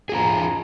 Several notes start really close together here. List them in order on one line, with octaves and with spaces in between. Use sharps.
G#4 F4 A#5